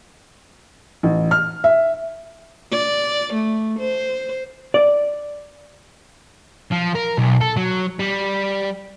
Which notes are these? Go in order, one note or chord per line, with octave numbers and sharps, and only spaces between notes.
A1
F6
E5
D5
A3
C5
D5
F3
A#4
B1
A4
F#3
G3